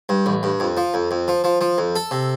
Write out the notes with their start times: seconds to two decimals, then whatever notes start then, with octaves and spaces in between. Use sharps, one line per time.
0.09 G2
0.26 A1
0.43 G2
0.60 F2
0.77 F3
0.94 F2
1.11 F2
1.28 F3
1.44 F3
1.61 F3
1.78 F2
1.95 A4
2.11 C3